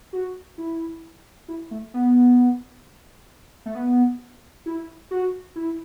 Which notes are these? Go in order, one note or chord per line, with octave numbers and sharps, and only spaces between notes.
F#4
E4
E4
A3
B3
A3
B3
E4
F#4
E4